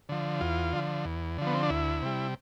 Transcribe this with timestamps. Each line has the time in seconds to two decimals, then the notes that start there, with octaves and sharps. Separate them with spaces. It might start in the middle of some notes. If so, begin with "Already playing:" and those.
0.09 D3 F3
0.41 E2 F4
0.73 D3 F3
1.05 E2
1.38 D3 F3
1.47 B3
1.54 C4
1.63 D4
1.70 D2 E4
2.02 C3 G3